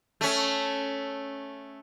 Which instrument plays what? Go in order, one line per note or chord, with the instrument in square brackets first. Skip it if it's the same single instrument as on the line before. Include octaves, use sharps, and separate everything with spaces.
[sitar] A3 C#4